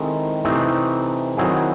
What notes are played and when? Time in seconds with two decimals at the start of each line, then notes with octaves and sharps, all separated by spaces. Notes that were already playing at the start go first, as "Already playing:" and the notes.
Already playing: D#3 G#3 C4 E4 A4
0.45 C3 E3 A3 C4 D#4
1.37 D#3 F#3 C4 E4 G#4